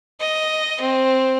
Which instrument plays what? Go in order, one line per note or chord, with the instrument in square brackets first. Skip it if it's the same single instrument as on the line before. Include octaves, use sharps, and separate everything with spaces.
[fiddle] D#5
C4